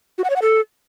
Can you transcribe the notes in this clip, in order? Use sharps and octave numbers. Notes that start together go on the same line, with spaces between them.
F#4
F#5
C#5
F#5
A4